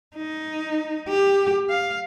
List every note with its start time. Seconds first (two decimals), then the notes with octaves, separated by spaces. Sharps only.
0.16 D#4
1.09 G4
1.70 F5